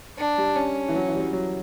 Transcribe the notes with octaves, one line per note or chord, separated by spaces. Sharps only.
D4
G3
C#4
E3
F#3
E3
G3
F#3
F#3